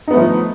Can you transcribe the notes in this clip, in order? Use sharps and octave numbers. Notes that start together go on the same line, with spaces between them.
F3 A3 B3 D#4